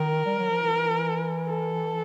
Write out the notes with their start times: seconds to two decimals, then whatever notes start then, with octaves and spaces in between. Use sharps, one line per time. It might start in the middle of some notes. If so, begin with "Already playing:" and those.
Already playing: D#3 A#4
0.26 G3
0.38 F#3
0.51 F3
0.64 E3
1.48 A4